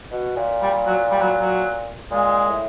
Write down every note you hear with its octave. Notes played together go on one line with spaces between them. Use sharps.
B2
A#2
G3
F#3
G3
F#3
F#3
A#2 G#3
A2